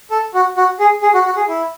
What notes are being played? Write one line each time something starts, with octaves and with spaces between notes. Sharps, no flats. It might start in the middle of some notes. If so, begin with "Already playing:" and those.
A4
F#4
F#4
G#4
G#4
F#4
F#4
G#4
E4